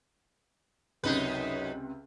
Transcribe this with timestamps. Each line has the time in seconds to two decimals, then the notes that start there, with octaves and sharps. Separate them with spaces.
1.04 C#2 F#2 C3 D#4 B4